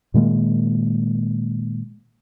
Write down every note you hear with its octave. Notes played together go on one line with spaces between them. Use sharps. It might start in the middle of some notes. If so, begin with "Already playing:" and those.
A#2 D#3 G#3 A#3